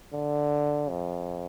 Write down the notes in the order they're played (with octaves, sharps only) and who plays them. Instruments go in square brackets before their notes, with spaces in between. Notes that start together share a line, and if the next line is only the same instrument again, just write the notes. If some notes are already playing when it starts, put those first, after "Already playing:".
[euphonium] D3
F2